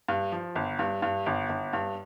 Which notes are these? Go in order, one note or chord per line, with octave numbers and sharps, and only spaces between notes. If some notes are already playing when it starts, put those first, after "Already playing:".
G2
F3
G1
G2
G2
G1
G1
G2